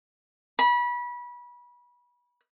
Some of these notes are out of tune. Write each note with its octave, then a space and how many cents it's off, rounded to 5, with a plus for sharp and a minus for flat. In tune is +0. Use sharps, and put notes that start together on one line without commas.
B5 -25